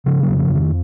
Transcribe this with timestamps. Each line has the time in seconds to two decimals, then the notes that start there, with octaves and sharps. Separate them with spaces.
0.06 C#3 F3
0.23 F#3
0.28 F2
0.38 F3
0.49 F2
0.55 D#3